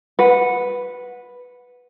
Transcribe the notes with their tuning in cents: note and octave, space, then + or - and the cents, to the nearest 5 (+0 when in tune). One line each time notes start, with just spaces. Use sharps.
B4 +0 F#5 -15